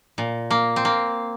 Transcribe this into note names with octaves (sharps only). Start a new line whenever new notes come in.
A#2
A#3
C4
A#3